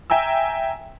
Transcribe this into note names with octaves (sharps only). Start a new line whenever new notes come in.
E5 G5 G#5 A#5 E6